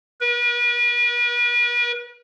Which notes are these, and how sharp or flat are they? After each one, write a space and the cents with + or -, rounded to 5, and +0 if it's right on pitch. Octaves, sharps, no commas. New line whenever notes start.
B4 -40